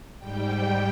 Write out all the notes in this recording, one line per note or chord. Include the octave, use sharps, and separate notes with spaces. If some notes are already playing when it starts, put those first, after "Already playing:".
G#2 G3 G5